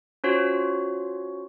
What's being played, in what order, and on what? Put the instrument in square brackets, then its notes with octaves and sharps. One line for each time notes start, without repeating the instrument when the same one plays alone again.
[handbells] C#4 F4 F#4 C5 C#5